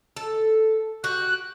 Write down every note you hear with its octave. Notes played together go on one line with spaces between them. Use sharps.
A4
F#4 G4 F#6